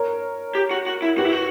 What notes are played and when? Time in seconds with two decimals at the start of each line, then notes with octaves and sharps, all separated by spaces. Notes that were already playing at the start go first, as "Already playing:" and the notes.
Already playing: A#4 C#5
0.55 G4
0.71 F#4
0.87 F#4
1.02 E4
1.18 F#4 G4 B4
1.25 E4
1.32 F#4